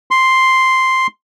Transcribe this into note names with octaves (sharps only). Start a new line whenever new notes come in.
C6